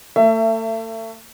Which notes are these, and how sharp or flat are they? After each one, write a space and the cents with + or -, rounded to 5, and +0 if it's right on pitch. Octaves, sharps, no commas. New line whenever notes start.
A3 +35 E5 +25